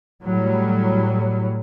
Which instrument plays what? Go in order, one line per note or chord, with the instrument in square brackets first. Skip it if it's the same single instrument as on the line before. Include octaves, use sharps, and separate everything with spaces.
[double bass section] A2 F#3 G3